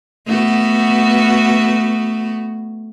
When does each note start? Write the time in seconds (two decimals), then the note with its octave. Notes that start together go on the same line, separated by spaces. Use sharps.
0.26 A3 B3 F#4